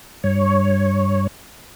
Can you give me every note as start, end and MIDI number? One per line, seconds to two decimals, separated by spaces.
0.24 1.27 43
0.24 1.27 73